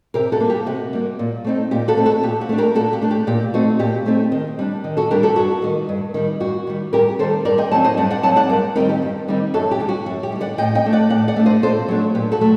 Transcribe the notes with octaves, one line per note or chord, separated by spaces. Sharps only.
C3 G4 A#4
F#4 A4
G3 A#3
G4
C3 F#4
G3 A#3
A#2
A3 C4 D#4
A#2 G4
F#4 A4
A3 C4 D#4
F#4 A4
A#2 G4
F#4
A3 D4
G4 A#4
A#2 F#4 A4
G4
A3 D4
G4
A#2 G4
A3 C4 D#4 F#4
A#2 G4
A3 C4 D#4
D#3
G3 D4
D#3
F#4 A4
G3 D4 G4 A#4
F#4 A4
G2 F#4
D#3 G3
G2
D#3 G3
G2 F#4
D#3 G3
G2 G4 A#4
D#3 G3 A4 C5
G2 A#4 D5
D#5 G5
F#3 C4 D#4 F#5 A5
C5 D#5
G2 D5 F#5
D5 F#5
F#3 C4 D#4 F#5 A5
D5 F#5
G2 A#4 D5
D#3 G3 C4 D#4 G4 A#4
G4
G2
D#3 G3 C4 D#4
F#2 F#4 A4
G4
D3 G3
F#4
F#2 F#4
G4
D3 G3
D5 F#5
A2 D#5 G5
D#5 G5
A3 D4
D5 F#5
A2 D5 F#5
D5 F#5
A3 D4
C5 D#5
A#2 A4 C5
F#3 A3 D4
A#2 G4
F#4 A4
F#3 A3